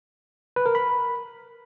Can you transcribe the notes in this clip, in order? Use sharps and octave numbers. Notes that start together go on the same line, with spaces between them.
B4
A#4
B5